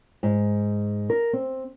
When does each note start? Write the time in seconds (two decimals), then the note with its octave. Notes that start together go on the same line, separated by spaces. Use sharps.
0.23 G#2
1.10 A#4
1.33 C4